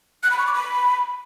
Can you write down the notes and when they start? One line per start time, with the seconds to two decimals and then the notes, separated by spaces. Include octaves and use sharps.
0.23 F#6
0.31 B5
0.38 C#6
0.46 D6
0.54 B5